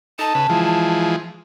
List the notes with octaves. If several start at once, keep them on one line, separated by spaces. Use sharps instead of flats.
D#4 A4 A5
C#3 B4
E3 F3 G#3